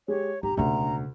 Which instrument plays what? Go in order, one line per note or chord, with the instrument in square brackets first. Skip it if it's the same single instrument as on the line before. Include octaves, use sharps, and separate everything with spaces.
[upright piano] G#3 G4 [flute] C#5
[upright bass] G1 [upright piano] G4 [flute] A#5
[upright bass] E1 C#3 [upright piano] D2 [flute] A#5